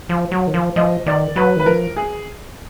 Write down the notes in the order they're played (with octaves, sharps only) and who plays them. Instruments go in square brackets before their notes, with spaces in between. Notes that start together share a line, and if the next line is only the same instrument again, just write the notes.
[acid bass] F3
F#3
D#3
F3
[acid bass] F3 [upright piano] D#5
[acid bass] D#3 [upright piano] D5
[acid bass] F#3 [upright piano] B4
[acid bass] D#3 [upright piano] B4
[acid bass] F3 [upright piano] A#4
[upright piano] G#4